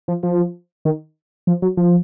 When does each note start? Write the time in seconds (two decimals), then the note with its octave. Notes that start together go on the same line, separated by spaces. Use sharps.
0.08 F3
0.23 F3
0.85 D#3
1.47 F3
1.62 F#3
1.77 F3